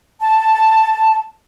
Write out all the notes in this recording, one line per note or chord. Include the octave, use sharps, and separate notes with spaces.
A5